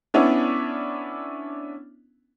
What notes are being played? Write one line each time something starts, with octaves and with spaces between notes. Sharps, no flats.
B3 C#4 D4 E4